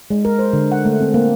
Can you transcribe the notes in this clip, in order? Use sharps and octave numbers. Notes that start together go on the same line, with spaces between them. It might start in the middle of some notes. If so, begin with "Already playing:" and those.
G#3
A#4
C5
D3
F#5
A3
C4
A#3